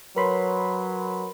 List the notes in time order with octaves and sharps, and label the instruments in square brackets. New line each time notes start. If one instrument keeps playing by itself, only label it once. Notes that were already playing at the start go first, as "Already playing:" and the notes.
[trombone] F#3 [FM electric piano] A#4 B5 C6 [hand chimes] B4 C#5